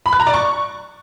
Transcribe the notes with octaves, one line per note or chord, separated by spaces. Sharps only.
B5
F#6
A#5
D5
C#6